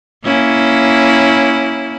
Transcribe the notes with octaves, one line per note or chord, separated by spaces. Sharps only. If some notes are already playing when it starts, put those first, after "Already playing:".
A#3 C#4 E4